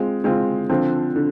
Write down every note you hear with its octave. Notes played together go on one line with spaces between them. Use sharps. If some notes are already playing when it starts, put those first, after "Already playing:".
Already playing: G#3 C4 F4
G#3 C4 F4
D3 F3 C4 F4
D3